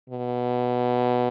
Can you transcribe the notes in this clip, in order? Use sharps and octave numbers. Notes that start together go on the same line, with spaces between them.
B2